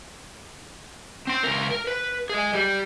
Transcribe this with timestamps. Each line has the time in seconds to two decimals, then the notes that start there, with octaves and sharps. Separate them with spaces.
1.27 C4 C6
1.43 C#2 A#4
1.71 A#4
1.87 B4
2.30 G#4 D#5
2.53 G3 G4